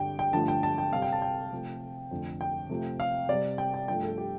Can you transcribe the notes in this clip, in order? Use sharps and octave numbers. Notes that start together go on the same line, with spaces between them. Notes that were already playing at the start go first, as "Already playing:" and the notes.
Already playing: G2 D3 G3 G5
G5
G2 D3 F3 A3 A5
G5
A5
G5
C3 G3 F5
G5
A5
G5
C3 F3 A3
F2 D3 A3
G5
C3 F3 A3
F5
C3 G3 D5
G5
G5
G2 F3 A3 G5
A4
G4